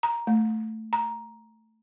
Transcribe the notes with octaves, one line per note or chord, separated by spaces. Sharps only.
A#5
A3
A#5